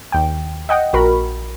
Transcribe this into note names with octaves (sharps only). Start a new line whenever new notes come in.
D#2 G5
D#5 F#5 G5
A#1 F#4 A#4 B5